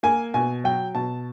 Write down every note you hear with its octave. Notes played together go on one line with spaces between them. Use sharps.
A#3 G#5
B2 G#5
F#3 G5
B2 A5